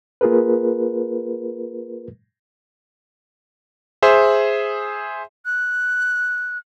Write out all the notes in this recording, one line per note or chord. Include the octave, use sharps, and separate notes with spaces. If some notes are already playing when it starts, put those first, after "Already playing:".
A#3 F4 G#4 A#4 B4
G#4 C5 E5
F#6